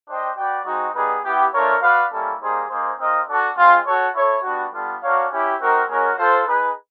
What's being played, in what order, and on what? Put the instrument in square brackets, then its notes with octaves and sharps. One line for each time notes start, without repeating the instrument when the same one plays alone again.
[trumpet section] D4 G4 C5 D#5 G5
F#4 B4 D5 G5
G#3 C4 D#4 F#4
G3 B3 D#4 G#4 B4
B3 E4 G4
A3 D4 F4 A#4 C#5
F#4 B4 D5 F5
G3 A#3 C#4 E4 A4
G3 A#3 D#4 G#4 C5
A#3 D#4 G#4 C5
C4 F4 A#4 D#5
D4 F#4 A4
G#3 C4 F4
F#4 A4 C#5
E4 A4 C#5
G3 B3 D4 F#4
G3 B3 D4 F4 A4
D4 F#4 A#4 C#5 F5
C#4 E4 G4
C4 D#4 F#4 A#4
G#3 C#4 F#4 A#4
F4 A4 C5
D#4 G#4 B4